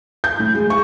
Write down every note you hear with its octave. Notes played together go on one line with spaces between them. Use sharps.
G6
A2
G#3
C#6